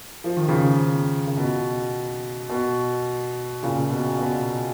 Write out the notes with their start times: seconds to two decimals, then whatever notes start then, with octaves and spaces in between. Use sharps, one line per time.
0.24 F3
0.37 D#3
0.48 C#3 F3
1.27 C#3
1.37 B2
2.49 B2
3.63 A#2 C#3
3.90 B2
4.18 B2